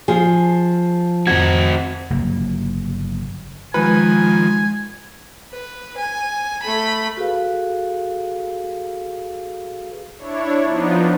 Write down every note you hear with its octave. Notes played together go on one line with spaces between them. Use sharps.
F3 G#4
F2 C4 F#4 G#6
G1 C#3 F#3 A#3
D#3 F3 G#3 B4 G#5
B4
G#5
A3 B5
F#4 G#4 A4 B4 F5
D4 E4 C#5
F3 B3 D4 D#4